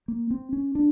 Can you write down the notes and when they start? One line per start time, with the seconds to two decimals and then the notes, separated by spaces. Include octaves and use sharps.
0.08 A#3
0.31 C4
0.53 C#4
0.75 D4